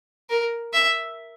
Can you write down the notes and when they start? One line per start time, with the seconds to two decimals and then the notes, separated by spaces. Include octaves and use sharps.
0.30 A#4
0.73 E5